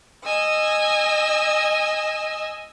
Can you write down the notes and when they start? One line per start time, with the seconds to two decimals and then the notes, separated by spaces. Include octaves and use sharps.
0.23 D#5 G#5 E6